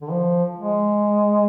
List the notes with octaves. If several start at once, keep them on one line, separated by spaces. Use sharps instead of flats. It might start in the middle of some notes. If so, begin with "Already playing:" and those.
D3
F3
G#3